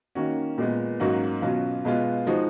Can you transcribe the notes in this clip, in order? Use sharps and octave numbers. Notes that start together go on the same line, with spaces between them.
D#3 A#3 C#4 F#4
A#2 G#3 B3
G#2 F#3 A#3 C#4 F#4
B2 F#3 C#4 F4
B2 G#3 B3 F4
F3 G#3 D#4 F#4